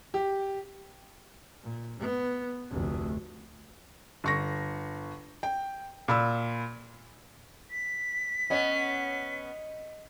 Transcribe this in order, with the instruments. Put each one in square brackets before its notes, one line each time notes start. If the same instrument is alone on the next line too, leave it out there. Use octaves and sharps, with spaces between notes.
[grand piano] G4
[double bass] A#2
B3
F1 D2
[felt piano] G1 C#6 A#6
G5
A#2 B5 E6
[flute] B6
[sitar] B3 C#4 [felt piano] D#5